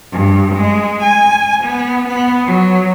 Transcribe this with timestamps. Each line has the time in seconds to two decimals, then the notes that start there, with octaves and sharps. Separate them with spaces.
0.12 G2
0.54 G#3
1.02 G#5
1.64 B3
2.09 B3
2.46 F#3